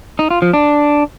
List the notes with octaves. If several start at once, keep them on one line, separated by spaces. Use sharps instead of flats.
D#4
F4
F3
D4